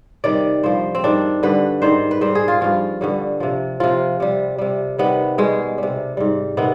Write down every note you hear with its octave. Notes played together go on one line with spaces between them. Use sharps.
C3 D#3 G3 D5
G2 F3 C5
C4
G#2 D#3 G3 D4
G2 D3 G3 B4
G#2 D#3 G3 C5
B4
G#2 G3 C5
G#4
F4
G2 F3 F4
G2 D3 G3
C3 F3
C3 F3 F4
C3 G3
C3 G3
C3 D#3 G3 B3
B2 G3 G#3
C3 G3
G#2 G3
C3 D#3 B3